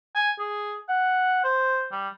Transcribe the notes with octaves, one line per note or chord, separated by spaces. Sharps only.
G#5
G#4
F#5
C5
G3